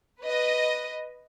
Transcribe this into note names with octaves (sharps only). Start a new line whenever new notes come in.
B4 D#5